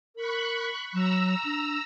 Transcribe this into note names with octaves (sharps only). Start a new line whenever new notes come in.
A#4 B5 C#6 F#6
F#3 A#5 E6
D4